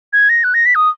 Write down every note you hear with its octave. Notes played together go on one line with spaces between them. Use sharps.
G#6
A#6
F#6
A#6
B6
D#6